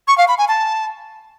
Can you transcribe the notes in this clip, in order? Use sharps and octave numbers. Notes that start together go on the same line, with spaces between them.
C#6
F5
B5
G#5
A5